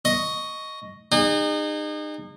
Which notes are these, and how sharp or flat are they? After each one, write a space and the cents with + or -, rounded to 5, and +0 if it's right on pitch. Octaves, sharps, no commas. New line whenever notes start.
D#5 +0 C#6 +5
D#4 -35 G#4 -40